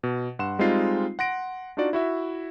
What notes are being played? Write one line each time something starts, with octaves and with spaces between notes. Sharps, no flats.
B2
G2 F#5 C6 E7
G3 G#3 C4 D#4 F4 C7
F#5 C6 A#6 D7
D4 D#4 F4 F#4 D5
E4 F#4 E5